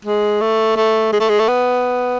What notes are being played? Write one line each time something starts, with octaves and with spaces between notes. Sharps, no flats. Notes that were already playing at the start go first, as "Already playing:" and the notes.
G#3
A3
A3
G#3
A3
G#3
A3
B3